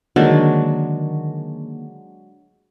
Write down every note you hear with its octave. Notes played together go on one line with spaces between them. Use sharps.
D3 D#3 F#3 G#3 A#3 D4